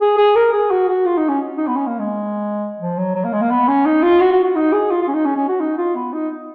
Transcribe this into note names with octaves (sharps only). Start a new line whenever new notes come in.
G#4
G#4
A#4
G#4
F#4
F#4
F4
D#4
C#4
D#4
B3
C#4
A#3
G#3
F3
F#3
F#3
A#3
G#3
A#3
B3
C#4
D#4
F4
F#4
F#4
F#4
D#4
G#4
F4
F4
C#4
D#4
C#4
C#4
F#4
D#4
F4
B3
D#4